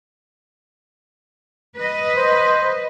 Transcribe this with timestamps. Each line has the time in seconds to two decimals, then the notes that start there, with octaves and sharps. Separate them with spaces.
1.75 B4 D#5
2.16 C5